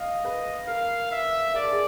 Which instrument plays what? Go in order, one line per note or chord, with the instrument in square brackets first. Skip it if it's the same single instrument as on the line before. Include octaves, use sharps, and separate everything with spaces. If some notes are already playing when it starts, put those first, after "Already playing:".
Already playing: [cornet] D#5 [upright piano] F5
[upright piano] B4
[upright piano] A#4 [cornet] F5
[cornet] E5
[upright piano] A#4 [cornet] D5
[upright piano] A4
G#4